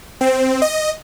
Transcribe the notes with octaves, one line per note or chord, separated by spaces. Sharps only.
C4
D#5